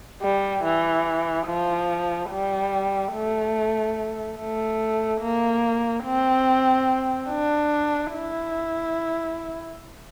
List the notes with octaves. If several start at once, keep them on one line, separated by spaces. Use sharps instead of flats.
G3
E3
F3
G3
A3
A3
A#3
C4
D4
E4